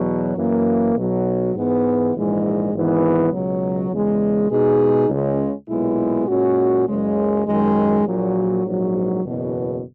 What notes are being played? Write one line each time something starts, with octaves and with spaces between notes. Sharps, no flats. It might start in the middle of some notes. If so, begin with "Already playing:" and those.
Already playing: E2 B2 F#3
F#2 E3 A#3
B1 B2 F#3
G#2 E3 G#3 B3
A#1 G#2 E3 G#3
G#1 G#2 E3 B3
C#2 B2 F#3
E2 C#3 G#3
B2 G#3 D#4 G#4
C#2 C#3 G#3
B1 A#2 G#3 B3 E4
A#2 G#3 C#4 F#4
F#1 F#2 C#3 G#3
F#2 D#3 G#3
A#1 A#2 F#3
A#1 G#2 F#3
F#1 E2 B2